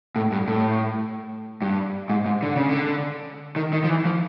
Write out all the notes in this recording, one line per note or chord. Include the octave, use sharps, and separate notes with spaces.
A2
G2
A2
G2
G#2
G#2
D3
C#3
D3
D#3
D#3
F3
E3
F3